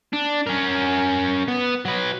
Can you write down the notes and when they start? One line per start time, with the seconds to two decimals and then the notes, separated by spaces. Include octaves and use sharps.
0.13 D4
0.47 C#4 A#4
1.48 B3
1.85 F#3 B4